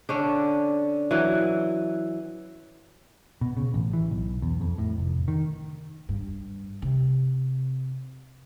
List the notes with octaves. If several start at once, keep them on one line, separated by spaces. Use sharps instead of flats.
D3 C#4 D4
E3 F#3
B2
C#3
A1
E3
B1
E2
F2
A2
F1
D#3
G2
C3